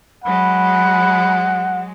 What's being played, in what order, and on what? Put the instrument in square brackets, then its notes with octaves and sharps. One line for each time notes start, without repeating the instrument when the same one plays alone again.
[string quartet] F#3 G#3 [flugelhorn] F#5 [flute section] B5